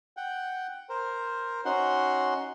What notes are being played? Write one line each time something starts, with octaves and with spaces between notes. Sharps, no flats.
F#5 G5
A#4 C5
C#4 D#4 F#4 F#5 C6